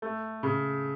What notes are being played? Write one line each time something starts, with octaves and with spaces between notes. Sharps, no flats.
A3
C#3